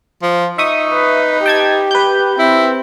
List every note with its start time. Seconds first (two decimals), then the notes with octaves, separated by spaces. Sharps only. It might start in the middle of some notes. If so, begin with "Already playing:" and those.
0.23 F3
0.58 D#4 E5 C#6 D#6
0.93 B4
1.46 G4 G5 A5 G#6
1.91 B4 G6
2.39 C4 E4